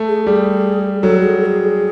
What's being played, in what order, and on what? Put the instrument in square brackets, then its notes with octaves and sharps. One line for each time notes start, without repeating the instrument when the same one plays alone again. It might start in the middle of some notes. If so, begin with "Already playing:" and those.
Already playing: [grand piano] A3
[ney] G#4
[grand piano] G3 [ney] G#4
[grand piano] F#3 [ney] A4
[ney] G#4
A4
G#4